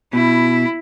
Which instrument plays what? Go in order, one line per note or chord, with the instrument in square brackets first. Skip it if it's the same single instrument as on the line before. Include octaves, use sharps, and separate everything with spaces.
[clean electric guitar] B2 [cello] E4